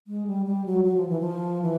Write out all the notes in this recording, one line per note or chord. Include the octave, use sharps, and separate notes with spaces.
G#3
G3
G3
F#3
F#3
F3
E3
F3
E3